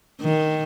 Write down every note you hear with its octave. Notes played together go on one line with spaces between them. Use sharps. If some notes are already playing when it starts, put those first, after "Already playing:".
D#3